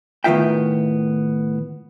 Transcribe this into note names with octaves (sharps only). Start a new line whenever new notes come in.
A2 D#3 B3 F4 E5 G5